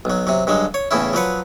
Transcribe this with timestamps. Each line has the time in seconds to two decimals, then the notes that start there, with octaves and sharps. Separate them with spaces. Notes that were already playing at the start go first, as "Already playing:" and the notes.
0.05 B1 F#3
0.27 C3 F#3
0.47 G2 D3 F#3 G#3
0.74 C#5
0.91 E2 A2 C#3 C#4 E4
1.13 F3 F#3 B4 F#5